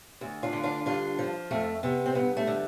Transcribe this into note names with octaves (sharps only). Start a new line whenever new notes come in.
D2
D4 F4
D3
D4 F4
G2 D4 F4
F3
F2 A3
C3 B3
C4
G2 B3
A3
D3